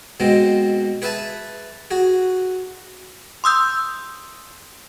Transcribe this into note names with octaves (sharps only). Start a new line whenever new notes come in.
B2 G#3 C4
G#4 B4 E5 G#5 A5
F#4 G#4
C6 D#6 E6 G6